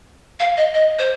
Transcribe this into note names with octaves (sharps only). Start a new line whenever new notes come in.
F5
D#5
D#5
C5